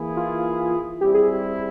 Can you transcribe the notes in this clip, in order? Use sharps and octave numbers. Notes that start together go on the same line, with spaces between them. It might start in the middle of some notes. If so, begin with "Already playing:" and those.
Already playing: E3 A#3 E4 G#4
F4
G3 C4 E4 G4
G#4